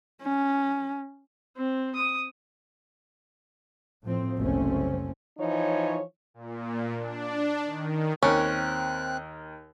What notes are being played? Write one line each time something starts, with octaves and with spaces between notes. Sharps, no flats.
C#4
C4
D#6
A2 F3 C4
F#1 C2 A3 C4 C#4
E3 F3 D#4 C#5
A#2
D4
D#3
D#2 C4 C#4 A#4 F#6